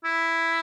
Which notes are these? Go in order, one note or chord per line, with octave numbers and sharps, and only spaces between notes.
E4